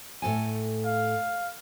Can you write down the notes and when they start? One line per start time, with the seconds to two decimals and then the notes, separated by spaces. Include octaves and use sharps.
0.22 A2 A4 G#5
0.86 F5